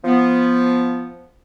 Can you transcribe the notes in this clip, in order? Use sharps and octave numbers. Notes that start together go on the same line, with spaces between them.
F3 B3